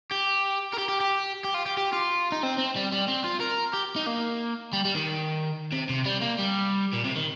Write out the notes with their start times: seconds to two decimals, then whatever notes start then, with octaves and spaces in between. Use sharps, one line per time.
0.12 G4
0.73 A#4
0.78 G4
0.89 G4
1.00 G4
1.44 G4
1.54 F4
1.66 G4
1.77 G4
1.93 F4
2.32 D#4
2.43 C4
2.58 C4
2.76 G3
2.93 G3
3.08 C4
3.24 F4
3.41 A#4
3.74 G4
3.96 D#4
4.07 A#3
4.73 G3
4.85 G3
4.95 D#3
5.72 C3
5.89 C3
6.05 G3
6.21 A#3
6.38 G3
6.93 A#2
7.04 C3
7.16 D#3